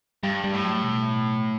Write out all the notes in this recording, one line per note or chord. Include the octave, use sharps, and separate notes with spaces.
G2 G3
G3
A2
F#3
B2